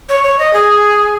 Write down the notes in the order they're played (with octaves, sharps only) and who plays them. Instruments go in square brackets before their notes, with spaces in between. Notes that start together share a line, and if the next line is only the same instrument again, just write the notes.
[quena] C#5
C#5
D#5
G#4